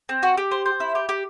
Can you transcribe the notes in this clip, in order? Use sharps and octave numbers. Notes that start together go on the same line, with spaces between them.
C4
F#4
G4
C5
C5
E4
G4
G4